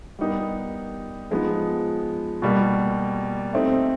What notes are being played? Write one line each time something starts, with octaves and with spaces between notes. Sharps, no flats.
G3 B3 D#4 G4 A#4
F3 G#3 B3 D#4
B2 G3 A#3
A3 C4 D#4